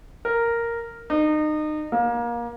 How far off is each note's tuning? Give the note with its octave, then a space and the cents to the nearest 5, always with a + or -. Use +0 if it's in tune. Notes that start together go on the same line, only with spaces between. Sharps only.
A#4 -5
D#4 -30
A#3 +25